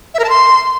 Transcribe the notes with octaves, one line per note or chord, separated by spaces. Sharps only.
E5
A#4
A5
C6